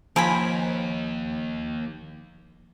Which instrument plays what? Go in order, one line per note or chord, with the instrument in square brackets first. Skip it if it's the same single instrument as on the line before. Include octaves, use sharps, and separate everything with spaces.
[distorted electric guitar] D#2 [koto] F3 [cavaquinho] A#4 G#5 B5